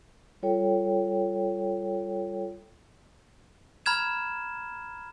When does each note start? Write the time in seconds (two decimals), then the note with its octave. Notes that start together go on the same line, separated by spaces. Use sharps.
0.43 G3 F4 A4 C#5 G5
3.86 A#5 B5 F6 G#6 E7